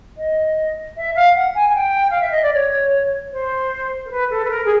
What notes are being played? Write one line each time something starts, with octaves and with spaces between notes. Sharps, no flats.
D#5
E5
F5
F#5
G#5
G#5
G5
F5
E5
D#5
D5
C#5
C5
A#4
B4
A4
B4
A#4
G#4